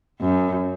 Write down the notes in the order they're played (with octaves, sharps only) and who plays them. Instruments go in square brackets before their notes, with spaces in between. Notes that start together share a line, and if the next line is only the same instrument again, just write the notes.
[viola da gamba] F#2